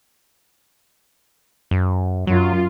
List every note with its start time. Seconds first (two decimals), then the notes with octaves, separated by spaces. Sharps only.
1.71 F#2
2.27 F#2 F#3 F4